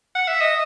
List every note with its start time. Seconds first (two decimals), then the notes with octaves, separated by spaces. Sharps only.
0.15 F#5
0.28 E5
0.41 D#5